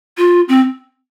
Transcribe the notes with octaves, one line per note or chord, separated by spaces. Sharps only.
F4
C4